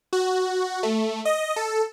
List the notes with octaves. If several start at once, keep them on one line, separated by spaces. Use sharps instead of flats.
F#4
A3
D#5
A4